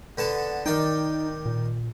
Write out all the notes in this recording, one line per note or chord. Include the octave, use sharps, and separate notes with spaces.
D3 B3 A5
D#3 D#4 D5 G5
A#2